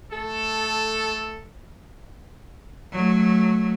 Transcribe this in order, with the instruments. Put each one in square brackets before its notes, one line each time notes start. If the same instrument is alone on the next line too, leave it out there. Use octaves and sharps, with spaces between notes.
[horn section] A3 A4
[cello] F#3 A3